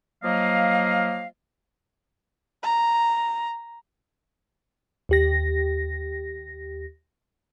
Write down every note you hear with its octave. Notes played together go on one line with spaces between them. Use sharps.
F3 F#3 A#3 D#5 F5
A#5
D#2 G4 A#6